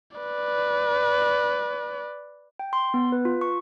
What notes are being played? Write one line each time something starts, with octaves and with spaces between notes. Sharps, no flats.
B4 D5
G5
C6
B3
B4
F4
C#6